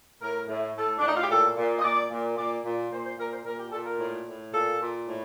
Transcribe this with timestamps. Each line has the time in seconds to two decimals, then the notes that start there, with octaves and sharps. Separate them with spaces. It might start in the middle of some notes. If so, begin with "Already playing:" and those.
0.21 A2 A#4
0.48 A2
0.75 A2 A4
0.98 D4
1.02 A2 D#4
1.14 F4
1.21 G4
1.29 A#2 A4
1.57 A#2
1.79 D#5
1.84 A#2 D5
2.11 A#2
2.37 A#2 D5
2.64 A#2
2.91 A#2 C5
3.05 C5
3.18 A#2 A#4
3.31 C5
3.45 A#2 A#4
3.59 G4
3.72 A#2 A4
3.86 A#4
3.99 A2
4.26 A2
4.53 A#2 A4
4.80 A#2
5.07 A2